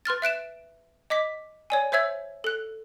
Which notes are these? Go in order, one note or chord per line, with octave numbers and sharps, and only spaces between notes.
B4 C6 F6 A6
E5 F#6 D7 E7
D#5 D6 B6
C#5 D5 G#5
C5 C#5 E5 E6 G#6
A4 F#6